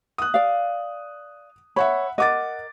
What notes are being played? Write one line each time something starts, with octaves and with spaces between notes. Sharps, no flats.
D#6 F#6
D5 F5
C#5 E5 F#5 B5
A#4 D#5 F#5 D6 A6